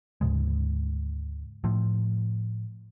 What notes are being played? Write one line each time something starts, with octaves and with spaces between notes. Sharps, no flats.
D2 G#2 C#3 G#3
A2 F3